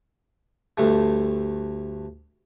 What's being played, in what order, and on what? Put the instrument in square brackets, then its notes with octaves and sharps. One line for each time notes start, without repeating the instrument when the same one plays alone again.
[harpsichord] D2 G2 A3